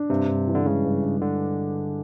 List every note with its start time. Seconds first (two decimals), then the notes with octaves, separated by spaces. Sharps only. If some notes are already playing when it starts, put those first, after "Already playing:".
Already playing: D4
0.10 G2 C3
0.28 G2
0.48 E3
0.55 D3
0.66 C#3 G#3
0.84 G2
1.02 G2
1.21 D3